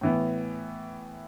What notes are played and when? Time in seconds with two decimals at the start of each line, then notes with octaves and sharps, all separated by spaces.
0.01 A2 E3 B3